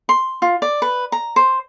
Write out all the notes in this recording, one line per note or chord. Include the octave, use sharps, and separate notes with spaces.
C6
F4
D5
B4
A#5
C5